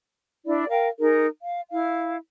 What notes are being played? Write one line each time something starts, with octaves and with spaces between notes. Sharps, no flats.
D4 E4 D5
A#4 F5 G5
D#4 G#4 A#4
F5
E4 F5